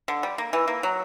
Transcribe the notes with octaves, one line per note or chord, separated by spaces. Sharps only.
D3
G3
A#3
E3
A#3
F#3